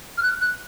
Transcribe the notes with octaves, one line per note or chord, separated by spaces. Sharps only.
F6
F#6
F#6